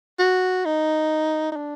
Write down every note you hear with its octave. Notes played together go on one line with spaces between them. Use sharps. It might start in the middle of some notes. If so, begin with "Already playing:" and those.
F#4
D#4
D#4
D4